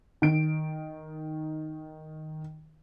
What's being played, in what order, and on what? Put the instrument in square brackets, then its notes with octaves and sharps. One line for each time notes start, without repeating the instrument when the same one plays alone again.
[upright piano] D#3 D7